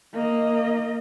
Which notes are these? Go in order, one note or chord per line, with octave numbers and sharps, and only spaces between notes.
A#3 D#5